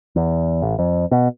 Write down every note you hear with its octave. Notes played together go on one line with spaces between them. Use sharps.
E2
A1
F2
B2